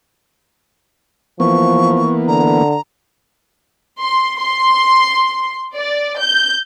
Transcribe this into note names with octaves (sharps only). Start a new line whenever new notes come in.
E3 F3 A#3 B3 C#6
D3 A#5
C6
C6
D5
G6